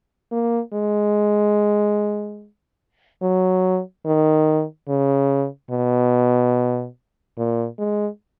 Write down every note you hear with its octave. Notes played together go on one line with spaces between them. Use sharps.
A#3
G#3
F#3
D#3
C#3
B2
A#2
G#3